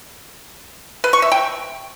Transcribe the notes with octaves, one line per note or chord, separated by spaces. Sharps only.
B4
C#6
E5
G5